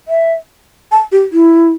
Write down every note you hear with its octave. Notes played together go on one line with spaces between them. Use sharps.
E5
A5
G4
E4